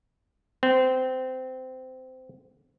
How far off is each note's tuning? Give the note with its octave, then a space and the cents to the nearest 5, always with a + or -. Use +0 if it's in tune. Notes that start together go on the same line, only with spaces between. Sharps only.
C4 -20